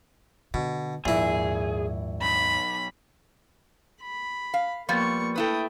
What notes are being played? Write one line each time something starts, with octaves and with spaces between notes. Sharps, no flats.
B2 D3
A#1 D#2 G#2 E4 G#4
B1 B5
B5
F5
F3 G3 A#3 B3 C#6
A3 E4 B4 G5 D#6